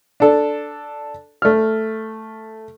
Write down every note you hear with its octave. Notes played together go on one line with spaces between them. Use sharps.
D4 A4
A3 F6